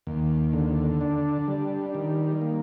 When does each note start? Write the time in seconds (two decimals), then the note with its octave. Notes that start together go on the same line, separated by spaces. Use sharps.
0.07 D#2
0.53 D3
1.01 D4
1.48 G3
1.95 D#3
2.41 A#3